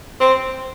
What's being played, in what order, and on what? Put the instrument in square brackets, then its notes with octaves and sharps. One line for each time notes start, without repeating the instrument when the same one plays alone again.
[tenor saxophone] C4